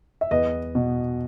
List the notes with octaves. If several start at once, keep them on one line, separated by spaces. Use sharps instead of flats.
E5
E2 B4 D#5
B2